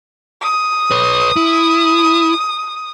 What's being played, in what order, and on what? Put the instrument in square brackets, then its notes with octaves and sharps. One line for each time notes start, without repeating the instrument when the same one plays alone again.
[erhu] D#6
[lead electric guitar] B4 C#5
E4